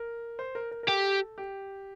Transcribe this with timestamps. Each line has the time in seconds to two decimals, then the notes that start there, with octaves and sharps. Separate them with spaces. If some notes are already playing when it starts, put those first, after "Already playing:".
Already playing: A#4
0.39 C5
0.55 A#4
0.71 A#4
0.83 A#4
0.88 G4 A4
1.38 G4